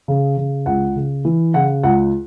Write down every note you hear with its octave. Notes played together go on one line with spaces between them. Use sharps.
C#3
C#3
C#2 F#5
C#3
E3
C#3 F#5
C#2 F#5